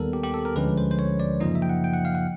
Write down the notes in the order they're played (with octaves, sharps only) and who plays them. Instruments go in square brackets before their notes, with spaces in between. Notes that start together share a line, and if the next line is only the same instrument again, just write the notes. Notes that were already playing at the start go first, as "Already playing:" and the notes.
Already playing: [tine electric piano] D#2 D#3 G3 B3 A4 A#4
G4
G4
A4
A#4
D2 D3 F3 G#3 C#4 B4
C5
C5
C#5
D5
F#2 C#3 F3 A#3 D#4 D#5
E5
G5
F#5
G5
F#5
F5
F#5